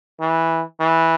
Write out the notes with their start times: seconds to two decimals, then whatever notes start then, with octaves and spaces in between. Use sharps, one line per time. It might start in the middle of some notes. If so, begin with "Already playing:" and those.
0.20 E3
0.80 E3